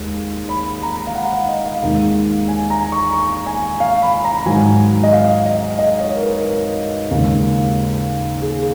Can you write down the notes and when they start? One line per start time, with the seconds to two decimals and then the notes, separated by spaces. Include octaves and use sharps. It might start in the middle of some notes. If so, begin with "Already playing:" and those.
Already playing: D#2 G#3
0.49 B5
0.83 A#5
1.07 F5
1.15 F#5
1.33 F5
1.49 D#5
1.65 F5
1.82 D#2 D#3 G#3
2.48 G#5
2.70 A#5
2.92 C#6
3.14 C#6
3.46 G#5
3.80 F5
4.02 B5
4.24 A#5
4.46 G#2 D#3 F#3 G#5
5.04 D#5
5.13 F5
5.46 D#5
5.79 D#5
6.00 C#5
6.16 A#4
6.22 B4
6.44 A#4
7.10 D#2 C#3 G#3
8.42 G#4